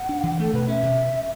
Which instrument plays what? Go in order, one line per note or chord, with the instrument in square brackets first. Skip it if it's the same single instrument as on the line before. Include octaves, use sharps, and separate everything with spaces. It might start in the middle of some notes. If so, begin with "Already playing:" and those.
Already playing: [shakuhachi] F#5
[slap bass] D4
E3
[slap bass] A3 [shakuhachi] A4
[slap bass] B2 [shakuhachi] B4
[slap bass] C#4 [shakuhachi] E5
[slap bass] B2